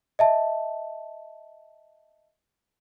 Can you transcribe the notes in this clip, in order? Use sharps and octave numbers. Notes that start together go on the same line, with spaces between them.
D#5 E5 A5